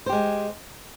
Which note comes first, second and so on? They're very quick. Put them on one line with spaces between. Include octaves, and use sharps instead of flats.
C5 G4 G#3